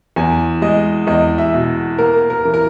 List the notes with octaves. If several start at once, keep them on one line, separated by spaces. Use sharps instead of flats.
E2 G#5
G#3 D#5
E2 D#5
E5
B2
A#3 A#4
A#4
E3
A#4